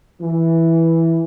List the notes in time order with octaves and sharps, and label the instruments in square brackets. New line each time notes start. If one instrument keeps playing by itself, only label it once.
[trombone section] E3